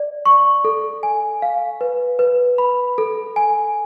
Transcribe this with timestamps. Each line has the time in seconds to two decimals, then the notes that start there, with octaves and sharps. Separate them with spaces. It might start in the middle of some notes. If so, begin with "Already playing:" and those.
Already playing: D5
0.26 C#6
0.65 A4
1.03 G#5
1.42 F5
1.81 B4
2.19 B4
2.58 B5
2.98 A4
3.36 G#5